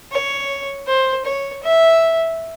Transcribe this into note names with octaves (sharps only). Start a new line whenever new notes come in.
C#5
C5
C#5
E5